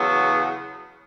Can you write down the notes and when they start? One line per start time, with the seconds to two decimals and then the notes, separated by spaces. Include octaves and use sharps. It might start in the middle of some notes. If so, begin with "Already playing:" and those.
Already playing: E2 C#3 F#3 B3